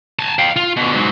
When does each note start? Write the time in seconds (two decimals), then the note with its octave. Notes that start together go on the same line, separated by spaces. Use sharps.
0.19 G#5 A5
0.39 F5 G5
0.56 F4
0.77 B2 D3
0.95 G#2 F#3